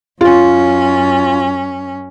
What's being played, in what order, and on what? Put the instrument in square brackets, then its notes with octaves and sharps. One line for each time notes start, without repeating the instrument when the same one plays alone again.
[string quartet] F#2 C#4 [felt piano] F4